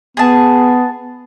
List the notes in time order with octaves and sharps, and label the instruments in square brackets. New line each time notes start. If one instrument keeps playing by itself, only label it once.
[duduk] B3 [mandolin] G#4 A5